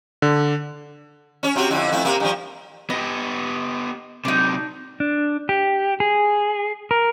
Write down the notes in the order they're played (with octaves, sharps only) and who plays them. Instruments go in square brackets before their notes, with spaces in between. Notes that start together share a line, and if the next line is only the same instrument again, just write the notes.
[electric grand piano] D3
[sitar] C#4 C#5
C3 C4 F#4
F2 D3 E4
F2 A3 E4
C3 A#3
G2 F3
[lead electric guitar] B3 G4 [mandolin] D#5
[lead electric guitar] C3 F#3 [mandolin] D4 D#4
[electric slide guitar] D4
G4
G#4
A#4